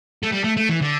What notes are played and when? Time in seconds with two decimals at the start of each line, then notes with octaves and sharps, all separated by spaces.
0.23 A3
0.32 G3
0.44 A3
0.57 A3
0.69 E3
0.81 D3